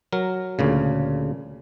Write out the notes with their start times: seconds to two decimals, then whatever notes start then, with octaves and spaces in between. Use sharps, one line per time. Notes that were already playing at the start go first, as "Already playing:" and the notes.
0.12 F#3 A#4
0.59 D2 A#2 C#3